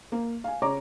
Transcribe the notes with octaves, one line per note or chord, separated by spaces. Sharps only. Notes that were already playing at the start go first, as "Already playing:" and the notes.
A#3
F5 G#5
C#3 C#4 C#5 A#5 D6